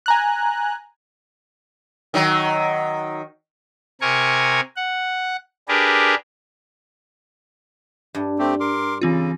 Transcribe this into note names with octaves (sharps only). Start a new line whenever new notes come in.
G#5 A#5 F#6
D#3 F#3
C3 A#4 G#5 C#6
F#5
D4 G4 G#4 A#4 B4
G2
A3 C4 G4
A#4 C6 D6
C#3 E3 C4 F4